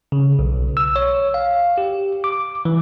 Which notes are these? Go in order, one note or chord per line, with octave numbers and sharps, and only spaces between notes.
C#3
B1
E6
C#5
F5
G4
D6
E3